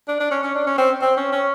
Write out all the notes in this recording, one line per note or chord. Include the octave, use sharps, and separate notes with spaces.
D4
D4
C#4
C#4
D4
C#4
C4
C4
C#4
C#4